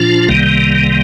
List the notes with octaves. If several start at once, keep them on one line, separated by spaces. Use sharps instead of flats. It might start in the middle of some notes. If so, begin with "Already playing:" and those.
Already playing: A#2 F3 D4 F4
C2 C3 D#3 G3 A#3